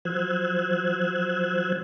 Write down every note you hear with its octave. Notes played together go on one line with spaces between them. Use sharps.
F3 F#3 C5 E6 F#6 G#6